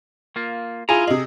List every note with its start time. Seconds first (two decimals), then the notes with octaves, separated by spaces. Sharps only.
0.36 A#3 F4
0.89 E4 F4 G#4 G#5 A#5
1.07 C3 G#4 D#5